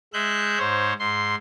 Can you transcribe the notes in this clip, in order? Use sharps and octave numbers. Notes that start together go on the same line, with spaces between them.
G#3 E5 F#6 G6
G#2 C5 C#5
G#2 C6